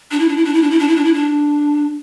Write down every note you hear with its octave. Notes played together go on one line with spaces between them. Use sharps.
D4
E4
D4
E4
D4
E4
D4
E4
D4
E4
D4
E4
D4